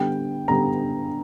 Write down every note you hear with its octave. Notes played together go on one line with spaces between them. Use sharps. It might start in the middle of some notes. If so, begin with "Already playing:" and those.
Already playing: D3 G3 B3 G5
D3 G3 B3 A#5